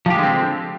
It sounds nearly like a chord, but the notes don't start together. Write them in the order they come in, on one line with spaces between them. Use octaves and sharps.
F3 G4 G#3 D3 C4